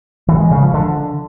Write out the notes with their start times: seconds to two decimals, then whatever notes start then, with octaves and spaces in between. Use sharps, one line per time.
0.28 E3
0.40 G#3
0.51 C#3
0.62 F3
0.74 D3